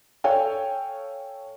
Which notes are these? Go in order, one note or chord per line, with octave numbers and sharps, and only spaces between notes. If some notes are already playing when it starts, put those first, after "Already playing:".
A4 C#5 F5 G5 G#5